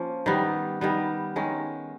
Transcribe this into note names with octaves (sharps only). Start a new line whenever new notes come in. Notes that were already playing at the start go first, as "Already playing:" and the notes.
Already playing: F3 A#3 C#4
D#3 G3 B3
D#3 G3 B3
D#3 G#3 C#4